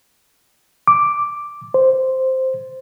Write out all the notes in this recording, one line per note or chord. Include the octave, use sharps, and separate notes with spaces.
D6
C5